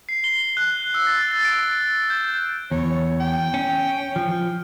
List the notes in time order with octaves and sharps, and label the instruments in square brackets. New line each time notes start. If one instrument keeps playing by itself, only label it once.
[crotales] C7
G7
F#6
E6
A6
A6
D7
G6
[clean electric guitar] E2 [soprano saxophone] C#5
[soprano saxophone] G5
[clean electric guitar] C#4
F3